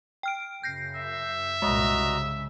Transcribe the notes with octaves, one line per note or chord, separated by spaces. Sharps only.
G5 F6 D7
F#2 C#3 G6 A#6 C7
E5
C2 G2 A#2 G#3 F#4 D#5 A#5
C#3